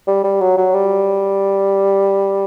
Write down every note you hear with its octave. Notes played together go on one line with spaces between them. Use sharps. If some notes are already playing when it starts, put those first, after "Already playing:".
G3
G3
F#3
F#3
G3